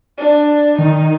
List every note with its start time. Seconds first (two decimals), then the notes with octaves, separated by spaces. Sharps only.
0.18 D4
0.79 D#3 D#4